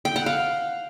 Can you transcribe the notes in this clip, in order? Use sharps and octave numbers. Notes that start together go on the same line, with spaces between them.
G5
F#5
F5